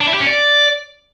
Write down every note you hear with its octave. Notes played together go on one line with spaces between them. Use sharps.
D4
E4
G4
C#4
D5